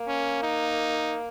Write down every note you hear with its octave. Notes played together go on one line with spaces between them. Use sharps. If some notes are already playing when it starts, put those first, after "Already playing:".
Already playing: A#3
C#4
D#4